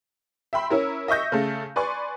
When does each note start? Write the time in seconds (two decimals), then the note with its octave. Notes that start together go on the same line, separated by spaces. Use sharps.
0.53 E5 G5 B5 C6
0.70 C#4 E4 A#4
1.08 D#5 E5 C#6 G6 A#6
1.32 C#3 A3
1.76 B4 D5 G#5 C6 C#6